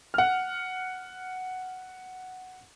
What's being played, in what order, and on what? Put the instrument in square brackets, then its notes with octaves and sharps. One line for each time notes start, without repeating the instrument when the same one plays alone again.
[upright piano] F#5 F6